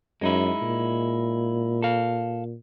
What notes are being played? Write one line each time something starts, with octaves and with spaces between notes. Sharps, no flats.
F#2 G#3 D#4 E4
A#2
A4 F5